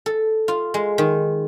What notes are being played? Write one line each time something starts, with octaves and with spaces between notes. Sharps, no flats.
A4
F4
G#3
D#3